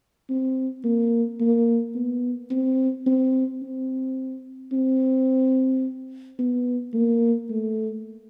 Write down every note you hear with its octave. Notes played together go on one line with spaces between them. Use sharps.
C4
A#3
A#3
B3
C4
C4
C4
C4
B3
A#3
A3